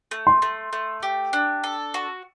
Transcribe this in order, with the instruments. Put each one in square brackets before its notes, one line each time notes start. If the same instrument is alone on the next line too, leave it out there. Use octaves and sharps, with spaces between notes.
[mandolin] A3
[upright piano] C6
[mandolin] A3
A3
G4
D4
A4
F#4